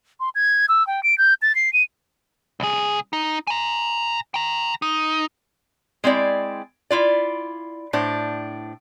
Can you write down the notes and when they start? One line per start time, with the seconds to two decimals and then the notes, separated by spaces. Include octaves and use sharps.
0.20 C6
0.35 G#6
0.69 E6
0.87 G5
1.03 D7
1.18 G6
1.42 A6
1.55 C7
1.73 D#7
2.60 C2 G#4
3.13 D#4
3.47 G#5 A#5
4.34 G5 A#5
4.82 D#4
6.04 G#3 C4 E4 D5
6.91 E4 F4 D5
7.93 A2 D4 C5